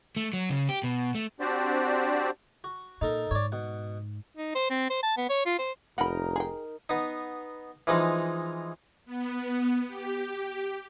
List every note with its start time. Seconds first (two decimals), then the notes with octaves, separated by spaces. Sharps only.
0.17 A3
0.33 F#3
0.49 C#3
0.69 G4
0.83 B2
1.15 A3
1.40 C4 D4 F#4 G4 C5 D5
2.64 F#4
3.01 A#2 D#4 A4 A#4
3.31 G#2 C#5 D5
3.52 B2 F#5
4.37 D#4
4.55 C5
4.70 C4
4.90 C5
5.03 A5
5.17 B3
5.29 C#5
5.46 F4
5.59 C5
5.98 F1 D#4 A#4 F#5 B5
6.36 G#4 G5
6.89 B3 D#4
7.87 E3 F3 G#3 D#4
9.06 B3
9.87 G4